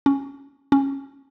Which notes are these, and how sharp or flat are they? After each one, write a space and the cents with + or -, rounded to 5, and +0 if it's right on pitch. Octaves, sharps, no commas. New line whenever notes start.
C#4 -5
C#4 -15